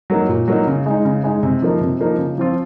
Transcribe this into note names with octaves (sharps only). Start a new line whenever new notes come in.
F#3 A#3 D#4
A#2
F#3 A#3 D#4
C#3
G#3 D#4
C#3
G#3 D#4
C3
F3 A#3 D#4
C3
F3 A#3 D#4
C#3
F3 C4 F4